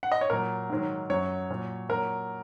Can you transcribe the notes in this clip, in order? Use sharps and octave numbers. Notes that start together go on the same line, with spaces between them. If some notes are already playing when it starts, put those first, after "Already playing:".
F#5
D#5
C#5
A#2 F#3 A#4
G#2 D#3 F#3
F#2 F#3 C#5
A#2 F#3
A#2 F#3 A#4